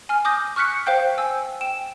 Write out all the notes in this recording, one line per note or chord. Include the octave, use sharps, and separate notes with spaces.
G#5 F6
D6 D#6 G6 A#6
C#6 F6 F#6 B6 C#7
C5 F5 G5 G6
G#5 E6
G5 E7